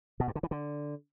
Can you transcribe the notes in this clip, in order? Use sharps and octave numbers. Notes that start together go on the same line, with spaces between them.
B2
G2
D3
E3
D3